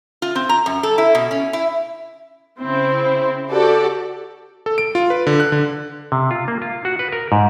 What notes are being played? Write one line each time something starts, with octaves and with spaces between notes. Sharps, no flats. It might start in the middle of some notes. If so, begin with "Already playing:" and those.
F4
C4
A#5
F#2
A4
E4
B2
C#4
E4
C#3 C4 E4
F#4 G4 A4 D5
A4
D7
F4
B4
D3
F#6
D3
C3
F4
A#3
F4
F#4
B4
A#4
G#2